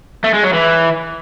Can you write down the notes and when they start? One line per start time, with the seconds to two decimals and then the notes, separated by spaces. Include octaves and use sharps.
0.24 A3
0.34 G#3
0.44 F#3
0.53 E3